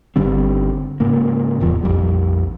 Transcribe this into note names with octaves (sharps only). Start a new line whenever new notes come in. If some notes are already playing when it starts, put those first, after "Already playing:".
G1 D3 G3 C4
G#2 C#3 A#3
D1 E2 F3
A#1 F2 G3